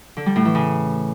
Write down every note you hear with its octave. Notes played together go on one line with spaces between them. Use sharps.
D3
G3
A2
E3
C#3